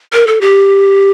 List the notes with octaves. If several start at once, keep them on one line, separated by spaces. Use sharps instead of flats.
A#4
A4
G4